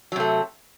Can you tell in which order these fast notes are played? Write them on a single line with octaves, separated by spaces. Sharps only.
F#3 C3 A3